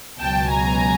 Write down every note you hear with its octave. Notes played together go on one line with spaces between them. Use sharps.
C#2 B2 F#3 G5 A5
G#5 A#5